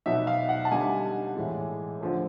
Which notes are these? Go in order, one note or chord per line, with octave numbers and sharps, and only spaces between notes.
B2 F#3 B3 D#4 E5
F5
F#5
A5
D3 G3 B3 D#4 G#5
A2 E3 G#3
D3 F3 A3